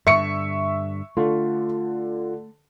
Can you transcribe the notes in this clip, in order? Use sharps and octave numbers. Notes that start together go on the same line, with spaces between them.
G2 D3 E5 C#6 C#7
D3 A3 F4